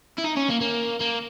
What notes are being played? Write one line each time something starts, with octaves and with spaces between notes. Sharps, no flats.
E4
D#4
C#4
A#3
A#3
A#3